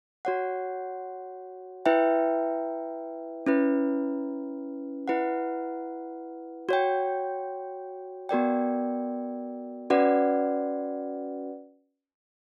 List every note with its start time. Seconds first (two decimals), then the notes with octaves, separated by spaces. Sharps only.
0.25 F#4 C#5 F#5
1.86 E4 B4 E5 G5
3.46 C#4 E4 B4
5.08 E4 B4 F#5
6.69 F#4 C#5 G5
8.29 B3 F#4 A#4 D5 G5
9.90 C#4 F#4 B4 D5 F#5